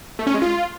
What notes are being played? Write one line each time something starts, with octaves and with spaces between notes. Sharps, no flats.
A3
C#4
G#3
F4